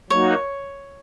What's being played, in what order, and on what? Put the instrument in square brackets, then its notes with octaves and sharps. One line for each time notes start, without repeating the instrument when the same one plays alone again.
[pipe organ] F#3 A#3 D#4 F#4 [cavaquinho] C#5